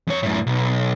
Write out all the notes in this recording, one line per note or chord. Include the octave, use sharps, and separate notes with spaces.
F2 C#5
F#2 A2
B1